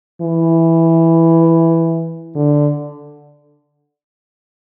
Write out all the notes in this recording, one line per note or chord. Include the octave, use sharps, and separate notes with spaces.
E3
D3